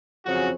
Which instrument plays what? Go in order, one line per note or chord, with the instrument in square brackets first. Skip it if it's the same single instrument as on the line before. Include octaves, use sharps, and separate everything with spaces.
[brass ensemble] F2 C#3 F#3 C#4 F#4